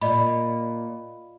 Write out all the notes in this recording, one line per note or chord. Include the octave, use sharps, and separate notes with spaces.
A#2 D5 D#5 B5